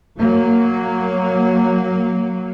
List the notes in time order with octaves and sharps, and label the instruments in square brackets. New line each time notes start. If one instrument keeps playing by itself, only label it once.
[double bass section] F#3 A#3